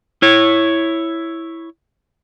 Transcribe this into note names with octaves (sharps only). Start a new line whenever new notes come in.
E4 C#5